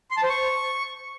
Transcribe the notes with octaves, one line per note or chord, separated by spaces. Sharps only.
C6
A5
C5
C#6